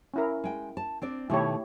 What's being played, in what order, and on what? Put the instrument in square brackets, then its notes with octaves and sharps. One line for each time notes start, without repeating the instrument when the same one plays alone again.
[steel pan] C#4 E4 A#4
[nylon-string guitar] G#3 G5
A5
C4 D4 D5
[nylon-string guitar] B2 D#3 A3 [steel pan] E4 G4 C#5